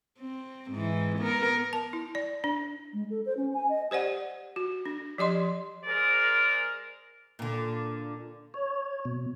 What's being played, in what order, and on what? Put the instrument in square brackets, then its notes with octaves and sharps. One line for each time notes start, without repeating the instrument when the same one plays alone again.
[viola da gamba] C4
G#2 E3
B3 A#4
[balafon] A5
E4
D5
D4
[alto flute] G#3
A4
C5
C#4
G#5
D#5
[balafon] G4 C5 D5 F#5
F#4
D4
F3 G4 D#5 C6
[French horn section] G#3 G#4 A#4 C5 D5
[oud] A#2 D3
[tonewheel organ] C#5
B2